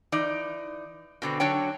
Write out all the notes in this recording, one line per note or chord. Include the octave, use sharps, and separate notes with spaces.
E3 D#4 D5
B2 D3 C4
D3 F#3 D4 C#5 G5